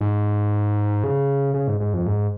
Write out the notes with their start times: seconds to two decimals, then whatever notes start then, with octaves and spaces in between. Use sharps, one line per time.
0.01 G#2
1.04 C#3
1.54 C#3
1.67 G#2
1.80 G#2
1.94 F2
2.06 G#2